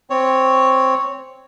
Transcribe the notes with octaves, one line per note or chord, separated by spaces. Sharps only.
C4 C#5